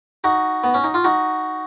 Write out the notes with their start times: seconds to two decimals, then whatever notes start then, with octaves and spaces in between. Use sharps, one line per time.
0.24 D#4 F#4
0.64 B3
0.74 C#4
0.84 D#4
0.94 F4
1.04 D#4 F#4